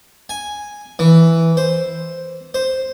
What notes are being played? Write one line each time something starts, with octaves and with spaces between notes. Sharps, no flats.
G#5
E3
C5
C5